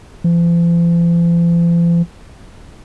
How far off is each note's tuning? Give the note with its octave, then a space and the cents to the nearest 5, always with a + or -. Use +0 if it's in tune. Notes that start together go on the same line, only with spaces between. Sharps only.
F3 -45